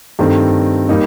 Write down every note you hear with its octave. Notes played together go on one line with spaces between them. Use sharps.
G2 D#3 A3 C4
G3 A#3 D#4